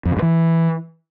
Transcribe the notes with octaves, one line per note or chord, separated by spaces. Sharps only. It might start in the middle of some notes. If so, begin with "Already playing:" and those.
F2
C#3
G2
E3